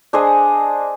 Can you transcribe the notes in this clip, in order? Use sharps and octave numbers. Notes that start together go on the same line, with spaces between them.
D4 G#4 C5 D#5